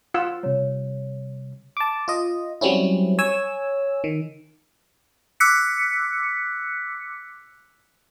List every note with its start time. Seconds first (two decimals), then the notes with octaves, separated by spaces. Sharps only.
0.14 F4 F#5 E6
0.43 C3 G3 C#5
1.77 A5 D6
2.08 F4 D#5
2.61 F#3 G3 C4 C#4 E4
3.19 C#5 G#5 E6
4.04 D#3
5.40 D6 E6 F#6 B6 C#7